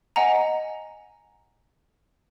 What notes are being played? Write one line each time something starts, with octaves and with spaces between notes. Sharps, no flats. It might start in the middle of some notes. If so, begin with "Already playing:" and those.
D#5 F#5 G#5 A#5